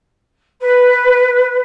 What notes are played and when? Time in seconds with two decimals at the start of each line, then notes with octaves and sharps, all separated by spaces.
0.59 B4